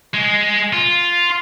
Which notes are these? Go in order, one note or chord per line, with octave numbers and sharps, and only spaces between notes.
G#3
F4